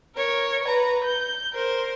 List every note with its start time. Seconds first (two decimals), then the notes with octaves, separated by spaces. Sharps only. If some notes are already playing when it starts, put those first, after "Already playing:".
0.15 A#4 C#5
0.63 B4 A#5
1.04 G6
1.53 A#4 C5